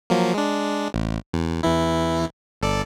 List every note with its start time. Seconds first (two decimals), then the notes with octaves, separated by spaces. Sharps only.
0.10 F3 F#3 A#3
0.34 G#3 D4
0.94 A1
1.33 E2
1.63 E2 E3 E4
2.61 G1 A4 D5